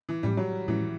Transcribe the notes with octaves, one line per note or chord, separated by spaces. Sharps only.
E3
A2 F3 G3 G#3 C#4
F#3
A2 E3 F3 G#3 C#4